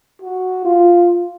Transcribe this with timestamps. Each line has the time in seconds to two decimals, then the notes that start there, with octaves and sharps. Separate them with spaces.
0.22 F#4
0.65 F4